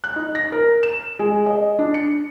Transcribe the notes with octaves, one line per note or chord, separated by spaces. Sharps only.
F#6
D#4
A#6
A#4
E7
G#3
D#5
D4
C#7